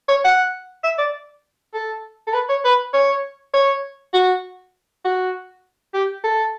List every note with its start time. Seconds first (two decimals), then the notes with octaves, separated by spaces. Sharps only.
0.08 C#5
0.24 F#5
0.83 E5
0.98 D5
1.73 A4
2.27 A4
2.33 B4
2.49 C#5
2.64 B4
2.93 C#5
3.53 C#5
4.14 F#4
5.05 F#4
5.94 G4
6.24 A4